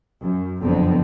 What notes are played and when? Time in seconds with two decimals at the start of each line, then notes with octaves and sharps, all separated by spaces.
0.21 F#2
0.63 F#1 F2 D3 B3 C4